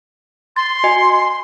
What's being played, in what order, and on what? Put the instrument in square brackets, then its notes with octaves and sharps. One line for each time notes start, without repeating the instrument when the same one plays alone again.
[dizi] C6 [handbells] A6
[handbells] F#4 D#5 G#5